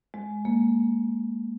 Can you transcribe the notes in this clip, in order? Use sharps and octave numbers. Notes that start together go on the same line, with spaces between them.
G#3
A#3